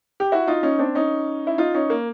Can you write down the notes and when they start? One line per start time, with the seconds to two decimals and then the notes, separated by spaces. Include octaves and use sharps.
0.20 G4
0.32 E4 F#4
0.47 D#4 F4
0.63 C#4 D#4
0.79 C4 D4
0.95 C#4 D#4
1.47 E4
1.58 D#4 F4
1.74 C#4 D#4
1.90 A#3